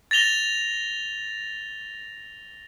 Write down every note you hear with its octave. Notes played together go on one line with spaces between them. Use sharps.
A6 A#6 F7 G7